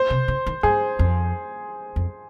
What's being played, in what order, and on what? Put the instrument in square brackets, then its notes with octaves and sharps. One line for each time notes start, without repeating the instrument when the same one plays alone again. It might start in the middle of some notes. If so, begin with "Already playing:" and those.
Already playing: [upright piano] C5
[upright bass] C3
C#3
D#3
[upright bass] G2 [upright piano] G#4
[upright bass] F2
F2